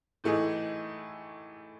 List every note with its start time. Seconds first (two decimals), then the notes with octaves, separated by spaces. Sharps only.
0.24 A2 E3 A3 D#4 G#4